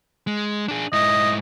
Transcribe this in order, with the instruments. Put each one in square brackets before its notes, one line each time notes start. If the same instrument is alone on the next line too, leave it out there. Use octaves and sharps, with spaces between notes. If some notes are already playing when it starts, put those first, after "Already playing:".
[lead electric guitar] G#3
D4 G#4
[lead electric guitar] G#2 E4 [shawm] D#5